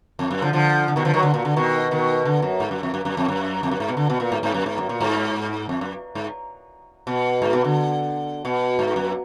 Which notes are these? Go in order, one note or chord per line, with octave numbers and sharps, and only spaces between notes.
F2
F#2
D3 F3
D3 F3
D3
B2 D#3
D3 F3
D#3 F#3
D3
A#2
D3
B2 D#3
B2 D#3
D3
F#2
G#2
F#2
F2
F#2
F#2
F2
F#2
F2
F#2
G#2
B2
D3
B2
A#2
G#2
G#2
F#2
G#2
F#2
A#2
G#2
F2
F#2
G#2
B2
G#2
B2
D3
B2
G#2
F#2